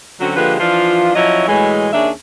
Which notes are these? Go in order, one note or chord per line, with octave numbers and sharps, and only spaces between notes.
D3 F#3 C4 C#4 F#4
D3 F3 G#3 A#3 G4 B4
E3 F3 D4 F4
F3 F#3 C#4 E4 C#5 D#5
A2 E3 F#3 G#3
D#2 D#3 C#4 D4 G#4 E5